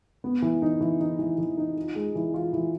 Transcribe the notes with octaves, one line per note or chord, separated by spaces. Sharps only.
B3
E3
D#4
E3
D#4
E3
E3
D#4
F4
G#3
E3
F4
E3